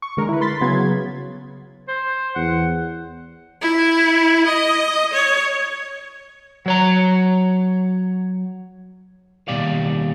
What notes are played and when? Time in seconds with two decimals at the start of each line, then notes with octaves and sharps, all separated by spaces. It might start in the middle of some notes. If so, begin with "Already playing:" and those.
0.02 C#6
0.17 D3 G#3 A#4
0.29 E4 B4
0.41 B5 C6 A6 B6
0.61 C#3 F#3 B3 G#6
1.88 C5
2.35 E2 F#5
3.61 E4
4.46 D#5
5.13 C#5
6.66 F#3 C#5 A#5
9.48 D#2 B2 G3 D5 F5